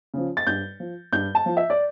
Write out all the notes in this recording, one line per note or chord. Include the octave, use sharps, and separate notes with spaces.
C#3 F3
A6
G2 G6
F3
G2 G6
A5
F3
E5
D5